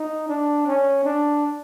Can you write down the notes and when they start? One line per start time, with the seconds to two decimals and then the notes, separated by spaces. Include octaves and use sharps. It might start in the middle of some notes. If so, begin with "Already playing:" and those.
Already playing: D#4
0.28 D4
0.66 C#4
1.05 D4